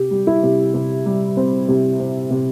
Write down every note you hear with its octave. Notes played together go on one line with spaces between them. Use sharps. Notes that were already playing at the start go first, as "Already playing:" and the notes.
Already playing: C3 G4
G3
E4
C3
C3
G3
C4
C3
C4
C3